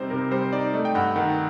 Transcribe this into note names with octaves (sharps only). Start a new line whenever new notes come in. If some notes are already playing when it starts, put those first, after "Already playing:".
Already playing: C3 G3 C4 D#4 C5 D5
C3 A#4
G3 C5
D#4 D5
A3 D#5
G5
G2 F#5
D#3 F#5